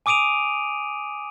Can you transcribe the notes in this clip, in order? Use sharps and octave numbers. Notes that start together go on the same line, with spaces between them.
G#5 D6 D#6 D7 D#7 F7